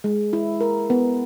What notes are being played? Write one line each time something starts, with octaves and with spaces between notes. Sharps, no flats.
G#3
E4
A#4
B3